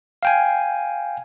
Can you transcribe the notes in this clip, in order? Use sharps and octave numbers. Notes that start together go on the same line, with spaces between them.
F5 G5 G#5